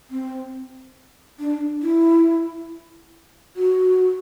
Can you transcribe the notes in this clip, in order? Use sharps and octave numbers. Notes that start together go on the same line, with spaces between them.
C4
D4
E4
F#4